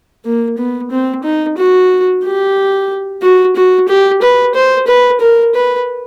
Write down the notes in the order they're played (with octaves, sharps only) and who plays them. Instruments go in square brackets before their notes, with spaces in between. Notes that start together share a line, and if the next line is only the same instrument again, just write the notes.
[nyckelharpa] A#3
B3
C4
D#4
F#4
G4
F#4
F#4
G4
B4
C5
B4
A#4
B4